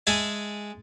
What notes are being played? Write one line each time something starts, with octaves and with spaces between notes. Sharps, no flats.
G#3 G#4 E5 G#5 A5